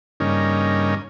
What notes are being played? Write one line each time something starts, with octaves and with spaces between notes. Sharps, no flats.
G2 C#3 A#3 C#4 D#4